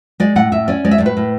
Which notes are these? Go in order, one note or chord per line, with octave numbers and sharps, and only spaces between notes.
G#3 D5
A2 F#5
A2 E5
C#4 D5
G#3 D5
E5
A2 D5
B4
A2